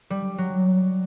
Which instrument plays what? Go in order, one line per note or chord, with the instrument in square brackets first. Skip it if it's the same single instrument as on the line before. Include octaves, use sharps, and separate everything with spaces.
[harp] G3
F#3